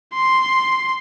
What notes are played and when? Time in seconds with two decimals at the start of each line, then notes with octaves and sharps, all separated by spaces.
0.14 C6